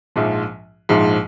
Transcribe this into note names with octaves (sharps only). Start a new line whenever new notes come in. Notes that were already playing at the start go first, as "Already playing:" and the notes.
A#1 G#2 F3
A#1 G#2 F3